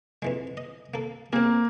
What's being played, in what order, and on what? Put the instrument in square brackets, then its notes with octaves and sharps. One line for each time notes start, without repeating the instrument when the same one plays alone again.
[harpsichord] F2 E3 G#3
D#5
A#3 A4
[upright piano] A#3 [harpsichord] C4 G#4